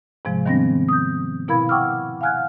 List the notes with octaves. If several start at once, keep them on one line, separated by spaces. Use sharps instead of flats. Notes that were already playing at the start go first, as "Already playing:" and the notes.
G#2 C3 F3 G#3
D#3 G3 B3 C4 D4 A#6
D#6 G6
B2 E4 A#4 F5 B5 G#6
F#5 G5 C#6 D6 E6 F6
F5 F#5 G#5 F6 F#6 G#6